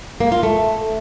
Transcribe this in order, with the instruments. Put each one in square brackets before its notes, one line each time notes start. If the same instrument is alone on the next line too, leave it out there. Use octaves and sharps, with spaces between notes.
[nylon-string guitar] A#3
F4
A3